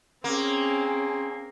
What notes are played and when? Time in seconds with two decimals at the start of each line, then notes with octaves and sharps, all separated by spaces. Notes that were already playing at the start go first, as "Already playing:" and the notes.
0.24 A#3 C4 C#4 G#4